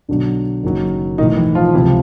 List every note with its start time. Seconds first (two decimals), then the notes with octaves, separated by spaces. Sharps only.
0.08 B1 B2 D3 F#3 D4
0.63 F#1 F#2 D#3 F#3
1.18 B1 A2 D#3 E3 D#4
1.36 E3 E4
1.55 F3 F4
1.73 C#2 C3 E3 F3 E4